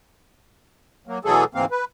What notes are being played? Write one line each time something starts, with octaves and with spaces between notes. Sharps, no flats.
F#3 A#3
B2 E3 F#3 A3 G#4 A4
D2 G#2 E3 A#3 C4 F5
B4